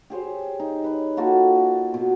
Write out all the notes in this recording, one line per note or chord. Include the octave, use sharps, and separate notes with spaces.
G4 G#4 C5 C#5
D#4
B4 C#5
A#3 F4 F#4 A4
B2